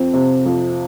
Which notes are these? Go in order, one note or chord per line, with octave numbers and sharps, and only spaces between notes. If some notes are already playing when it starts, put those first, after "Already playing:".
Already playing: F2 C4
C3
F2